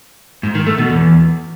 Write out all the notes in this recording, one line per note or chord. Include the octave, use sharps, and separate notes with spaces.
G#2
D#3
A3
B2
E2